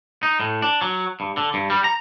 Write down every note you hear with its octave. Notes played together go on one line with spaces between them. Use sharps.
D#4
A2
D4
F#3
G2
D3
G2
G3
A#5